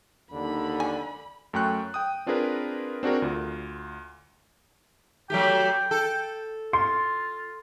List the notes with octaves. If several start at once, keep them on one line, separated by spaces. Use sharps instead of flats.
D#2 D3 B5
G#5
F#2 A3 G5 C#6 F#6
G5 D#6
C4 D4 F4 G#4 A#4 B4
C4 D4 F#4 G#4 A#4
D2 F4
F#3 A3 G4 G5
A4
F4 C6